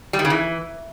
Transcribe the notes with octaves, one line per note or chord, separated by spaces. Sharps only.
G3
D#3
C#3
E3